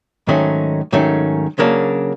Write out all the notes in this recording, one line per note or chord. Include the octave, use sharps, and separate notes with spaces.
G#2 D#3 F#3 A3 C#4
G#2 D#3 F#3 A3 C#4
C#3 F#3 A#3 D4